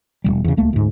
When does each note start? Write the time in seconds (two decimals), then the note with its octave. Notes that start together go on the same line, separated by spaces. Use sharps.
0.24 E1 B1 G3
0.44 E2 C#3
0.57 D#1 C#2 A3 A#3
0.73 D2 G#2